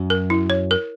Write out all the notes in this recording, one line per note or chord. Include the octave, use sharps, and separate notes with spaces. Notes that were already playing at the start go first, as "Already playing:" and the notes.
Already playing: F#2 F#3
A#4
E4
C#5
A#4